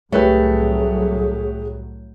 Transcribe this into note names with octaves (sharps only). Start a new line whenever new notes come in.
C2 A2 F#3 A3 G4 G#4 B4 C#5